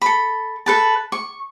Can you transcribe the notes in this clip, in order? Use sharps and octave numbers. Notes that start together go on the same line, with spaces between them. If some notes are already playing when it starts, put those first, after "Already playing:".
A4 B5
A4 B4 A5
C#6